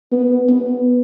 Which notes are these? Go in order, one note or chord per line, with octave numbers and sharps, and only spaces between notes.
B3
B3